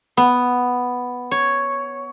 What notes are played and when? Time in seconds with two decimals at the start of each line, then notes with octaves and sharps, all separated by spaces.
0.17 B3
1.31 C#5